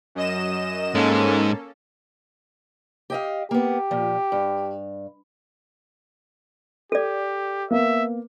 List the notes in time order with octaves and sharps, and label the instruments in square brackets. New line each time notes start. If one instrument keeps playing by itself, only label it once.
[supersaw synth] F#2 D#5 E7
[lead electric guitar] G#2 G#3 [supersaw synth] A#3 C#4 A4
[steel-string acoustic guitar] G4 D#5 F5
[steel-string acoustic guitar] A#3 B3 [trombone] G4
[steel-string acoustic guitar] A#2 F3
G2
[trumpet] G4 [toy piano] A4 D5
[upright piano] A#3 B3 [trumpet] E5